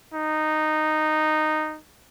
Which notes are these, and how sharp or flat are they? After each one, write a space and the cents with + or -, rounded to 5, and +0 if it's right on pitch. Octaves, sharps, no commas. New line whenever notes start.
D#4 -10